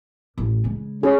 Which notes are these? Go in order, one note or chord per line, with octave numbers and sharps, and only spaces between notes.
A1
C#3 G#3
C#4 G#4